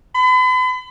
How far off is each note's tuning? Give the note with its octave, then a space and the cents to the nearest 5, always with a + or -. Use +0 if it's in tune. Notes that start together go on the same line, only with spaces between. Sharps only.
B5 +40